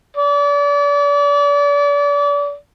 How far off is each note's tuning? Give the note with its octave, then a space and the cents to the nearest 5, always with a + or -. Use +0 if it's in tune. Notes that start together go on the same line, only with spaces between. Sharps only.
D5 -35